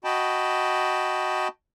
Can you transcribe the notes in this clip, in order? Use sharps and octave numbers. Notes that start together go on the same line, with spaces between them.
F#4 D#5 G5 A5 B5